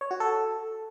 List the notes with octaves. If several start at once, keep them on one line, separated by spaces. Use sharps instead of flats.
C#5
F#4
A4